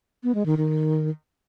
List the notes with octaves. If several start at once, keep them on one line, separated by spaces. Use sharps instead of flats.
B3
G#3
D#3
D#3